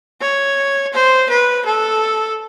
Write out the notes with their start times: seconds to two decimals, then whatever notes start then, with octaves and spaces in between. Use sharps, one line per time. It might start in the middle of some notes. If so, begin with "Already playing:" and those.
0.21 C#5
0.94 C5
1.30 B4
1.66 A4